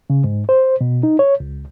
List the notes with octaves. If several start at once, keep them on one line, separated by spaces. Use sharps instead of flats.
C#3
G#2
C5
B2
D#4
C#5
C#2